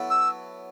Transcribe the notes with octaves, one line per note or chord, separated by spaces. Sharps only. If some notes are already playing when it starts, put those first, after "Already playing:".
Already playing: F#3 B3 E4 A4
E6